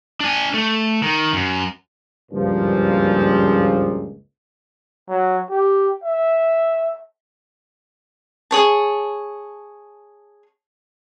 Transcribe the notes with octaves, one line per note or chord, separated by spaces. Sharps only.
D4 G#5
A3
D#3
F#2
F#1 C#2 G2 A#2 F3
F#3
G4
E5
G#4 C#5 A5